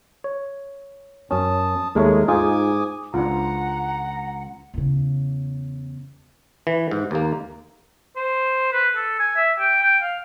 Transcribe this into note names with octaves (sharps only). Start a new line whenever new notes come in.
C#5
F#2 C#4 A5 D#6
D#2 G#3 A3 A#4 C#5
G#2 D#4 F4 G#4 G#5 D6 D#6
C#2 D4 F4 F#5 A#5
E2 C#3
E3
G#2
D#2 A#3
C5
B4
A4
G#5
E5
G5
G5
F5